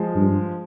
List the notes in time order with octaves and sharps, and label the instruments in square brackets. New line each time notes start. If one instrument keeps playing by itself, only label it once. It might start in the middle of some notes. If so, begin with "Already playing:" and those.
Already playing: [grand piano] F3 G#3
[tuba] G2